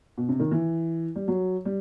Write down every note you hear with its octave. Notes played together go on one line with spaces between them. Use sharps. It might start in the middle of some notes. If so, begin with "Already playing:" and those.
B2
C3
D#3
E3
G3
F#3
G3